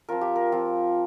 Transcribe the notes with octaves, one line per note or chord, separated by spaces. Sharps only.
F3 C4 F4 A#4
G4
A#4
F3 C4 F4